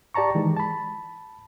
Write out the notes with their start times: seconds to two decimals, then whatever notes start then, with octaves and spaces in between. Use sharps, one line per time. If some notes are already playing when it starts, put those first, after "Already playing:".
0.14 G4 D5 A5 A#5 C#6
0.35 D#3 E3 G#3
0.57 A5 B5